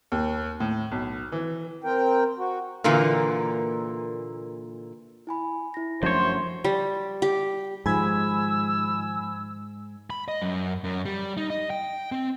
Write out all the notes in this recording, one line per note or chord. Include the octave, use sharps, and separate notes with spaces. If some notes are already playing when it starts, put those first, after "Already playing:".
D#2
A2
B1
E3
C4 A#4 G5
F#4
A#2 D3 E3 A#3
E4 G#5 B5
E4 A#6
F#2 F3 G3 A3 D4 C5 C#5 C6
G3
G4
G#2 D#3 F3 G#3 G#5 B5 E6 G#6
B5
D#5
F#2
F#2
G3
D#4
D#5
G5
C4